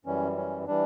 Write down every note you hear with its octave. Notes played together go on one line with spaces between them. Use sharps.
F#2 E3 G3 C#4
C#4
E3 G3 D4